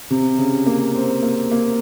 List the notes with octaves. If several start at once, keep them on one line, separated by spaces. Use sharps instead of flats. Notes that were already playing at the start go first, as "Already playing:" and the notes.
C3
C#3
A#3
C4
A#3
A#3